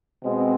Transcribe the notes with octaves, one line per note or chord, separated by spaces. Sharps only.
B2 G#3 C4